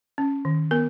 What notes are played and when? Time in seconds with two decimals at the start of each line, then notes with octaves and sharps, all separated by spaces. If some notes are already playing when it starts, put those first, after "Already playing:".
0.18 C#4
0.45 D#3
0.71 B3 A#4